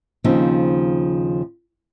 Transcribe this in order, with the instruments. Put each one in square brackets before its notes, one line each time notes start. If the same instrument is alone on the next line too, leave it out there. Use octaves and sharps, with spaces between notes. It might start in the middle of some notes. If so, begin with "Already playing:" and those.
[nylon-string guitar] D#2 C#3 F3 C4 D#4